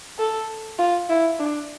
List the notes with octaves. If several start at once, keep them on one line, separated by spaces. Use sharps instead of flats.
A4
F4
E4
D4